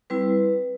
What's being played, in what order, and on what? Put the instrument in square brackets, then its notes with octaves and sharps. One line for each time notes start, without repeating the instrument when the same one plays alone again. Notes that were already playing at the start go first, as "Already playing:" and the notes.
[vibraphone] G3 C4 E4 B4